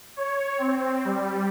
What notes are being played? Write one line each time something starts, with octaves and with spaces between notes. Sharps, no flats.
C#5
C4
G3